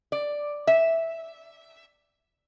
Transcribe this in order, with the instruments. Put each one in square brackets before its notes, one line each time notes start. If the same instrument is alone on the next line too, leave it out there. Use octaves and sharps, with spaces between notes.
[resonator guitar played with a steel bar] D5
E5